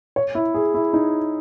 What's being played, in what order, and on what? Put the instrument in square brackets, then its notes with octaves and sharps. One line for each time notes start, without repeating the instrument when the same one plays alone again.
[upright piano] C#5
E4
G#4
E4
D#4